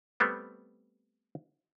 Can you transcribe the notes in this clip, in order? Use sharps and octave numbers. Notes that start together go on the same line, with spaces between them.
G3 A3 B3 C4